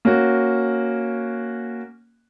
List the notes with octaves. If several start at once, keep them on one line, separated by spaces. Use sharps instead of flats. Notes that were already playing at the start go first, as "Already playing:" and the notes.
A#3 C#4 F#4